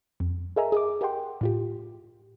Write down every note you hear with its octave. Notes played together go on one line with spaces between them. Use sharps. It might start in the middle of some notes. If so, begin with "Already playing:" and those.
F2
G#4 A#4 D#5 E5 G#5 A#5
G#4 D#5 D6
G4 A#4 D#5 F#5 G5 C6
A2 F4 G4